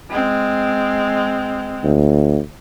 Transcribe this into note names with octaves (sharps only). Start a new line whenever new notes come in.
G#3 C4
D2